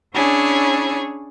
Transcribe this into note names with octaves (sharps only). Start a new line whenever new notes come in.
C#4 D4 E4 G#4 C#5